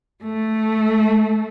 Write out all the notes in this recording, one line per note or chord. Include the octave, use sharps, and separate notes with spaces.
A3